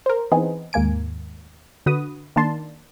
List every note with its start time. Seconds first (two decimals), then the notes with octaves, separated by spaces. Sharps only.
0.06 A#4 C5
0.32 E3 B3 C4 D#4 G#4
0.73 D#2 G#2 A#3 G#5 D7
1.86 D3 F#4 B4 D#6
2.36 D#3 A#3 D4 A5 C6